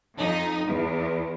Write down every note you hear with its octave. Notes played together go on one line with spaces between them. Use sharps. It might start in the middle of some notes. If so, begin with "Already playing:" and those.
F2 D#4
E2